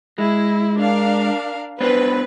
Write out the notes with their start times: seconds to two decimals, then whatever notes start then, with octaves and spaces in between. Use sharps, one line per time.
0.18 G#3 E4
0.77 D4 A#4 F5
1.81 B3 D4 B4 C5